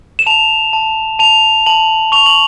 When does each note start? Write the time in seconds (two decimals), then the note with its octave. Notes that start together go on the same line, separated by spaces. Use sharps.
0.19 E7
0.26 A5 F7
0.73 A5
1.19 A5 F7
1.66 A5 F#7
2.12 C#6 F7
2.26 F#7